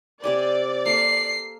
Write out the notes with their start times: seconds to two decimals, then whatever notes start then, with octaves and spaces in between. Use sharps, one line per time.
0.24 C3 G4 D5 G#5
0.86 A#3 A4 C7